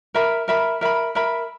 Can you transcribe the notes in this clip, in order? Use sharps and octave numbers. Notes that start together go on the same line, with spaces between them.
A#4 E5 B5
A#4 E5 B5
A#4 E5 B5
A#4 E5 B5